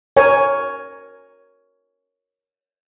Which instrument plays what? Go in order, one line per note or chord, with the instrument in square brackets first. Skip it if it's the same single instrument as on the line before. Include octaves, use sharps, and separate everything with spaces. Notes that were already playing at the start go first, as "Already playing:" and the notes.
[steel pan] A#4 C#5 G#5